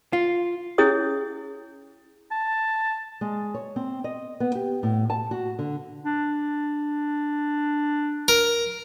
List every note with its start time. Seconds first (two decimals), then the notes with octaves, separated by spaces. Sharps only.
0.13 F4
0.78 C#4 E4 G#4 C#5 D#6
2.32 A5
3.21 G#3
3.54 C#5
3.76 C4
4.04 D#5
4.40 B3
4.55 G4
4.83 A2
5.10 A5
5.31 F#4
5.59 D3
6.03 D4
8.28 A#4